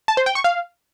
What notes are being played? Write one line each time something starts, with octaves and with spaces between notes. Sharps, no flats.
A5
C5
G5
C#6
F5